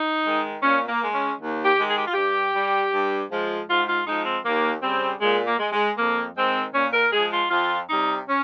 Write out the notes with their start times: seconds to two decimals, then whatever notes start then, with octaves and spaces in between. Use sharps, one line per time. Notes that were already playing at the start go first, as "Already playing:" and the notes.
Already playing: D#4
0.25 D#3 G#3
0.63 A#2 C#4
0.88 A#3
1.02 G#3
1.13 C#4
1.40 D#2
1.64 G4
1.77 D#3 G#3
1.90 G#4
1.98 G4
2.06 F4
2.14 G2 G4
2.53 G3
2.92 G2
3.30 F3 G#3
3.68 G#2 F4
3.88 F4
4.06 F3 G#3 D#4
4.25 C4
4.45 D#2 A#3
4.82 C#3 G3 C4
5.21 A#2 G#3
5.46 A#3
5.59 G#3
5.72 G#3
5.98 F2 A#3
6.36 D#3 G#3 C4
6.74 A#2 C#4
6.93 A#4
7.13 F3 G#3 G#4
7.31 F4
7.50 F2 F4
7.89 C3 G3 D#4
8.27 C#4